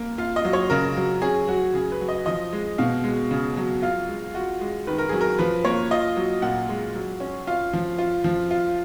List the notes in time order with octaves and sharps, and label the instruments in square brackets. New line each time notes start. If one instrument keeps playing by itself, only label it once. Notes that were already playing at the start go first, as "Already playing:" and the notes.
Already playing: [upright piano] A#3
F4 F5
D#5
F#3
C#5
C#3 A#4
F#3
C#4 G#4
F#3 F#4
C#3 G#4
B4
F#3
D#5
F3 D#5
G#3
B2 F5
G#3
C#3
F#3
F4 F5
G#3
F4 F#4
G#3
D#3 B4
A#4
F#3 G#4
A#4
F3 B4
A#3 C#5
F4 D#5
F#3
A#2 F#5
G#3
F#3
C#4
F4 F5
F3
F4
F3
F4